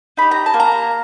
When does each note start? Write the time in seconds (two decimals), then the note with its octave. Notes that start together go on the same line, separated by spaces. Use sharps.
0.17 D#4 G4 B5
0.31 A#5
0.46 A5
0.54 A#3
0.60 A#5